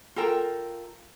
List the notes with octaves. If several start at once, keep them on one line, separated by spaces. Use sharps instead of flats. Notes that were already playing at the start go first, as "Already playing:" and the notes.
F4 A4 A#4 G5